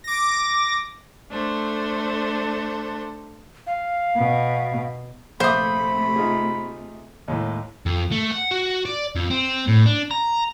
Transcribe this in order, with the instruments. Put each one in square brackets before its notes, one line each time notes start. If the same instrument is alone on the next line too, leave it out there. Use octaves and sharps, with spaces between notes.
[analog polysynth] D6 A#6
[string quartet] A3 D4 A4 C5
[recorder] F5
[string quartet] B2
[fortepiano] A#1 E5 D6 [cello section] C3 A3 [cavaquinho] C5 D#6 [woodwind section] B5
[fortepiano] D#4 F4 G#4
[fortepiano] D#2 A2 [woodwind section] G#3
[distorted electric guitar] F2
A3
F#5
F#4
D5
F2
C4
A2
D4
A#5